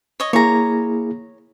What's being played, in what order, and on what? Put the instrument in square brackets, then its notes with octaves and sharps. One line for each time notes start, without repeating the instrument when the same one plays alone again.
[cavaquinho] C#5 D#5
[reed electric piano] A#3 E4 G#4 [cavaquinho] C#5 A#5